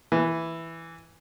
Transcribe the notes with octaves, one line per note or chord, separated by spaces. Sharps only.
E3